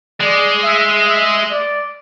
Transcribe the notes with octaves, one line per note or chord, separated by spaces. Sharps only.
G#3 D5
E5
E5
D5